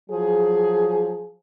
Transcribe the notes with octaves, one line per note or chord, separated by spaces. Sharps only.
F3 F#3 G#4